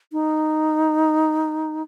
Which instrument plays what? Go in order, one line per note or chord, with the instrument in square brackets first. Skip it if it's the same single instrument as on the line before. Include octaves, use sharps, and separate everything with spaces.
[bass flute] D#4